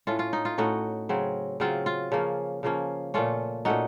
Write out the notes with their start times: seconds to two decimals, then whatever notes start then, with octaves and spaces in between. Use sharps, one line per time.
0.07 A2 A3 C#4 F4
0.19 F4
0.33 D#4
0.45 F4
0.58 A2 A3 C#4 D#4 F#4
1.09 C#3 F#3 C4
1.60 C#3 F#3 C4 F4
1.86 F4
2.12 C#3 F3 A#3 C#4
2.63 C#3 F3 A#3 C#4
3.14 A#2 A3 C#4 F4
3.65 A#2 A3 C#4 D#4 F#4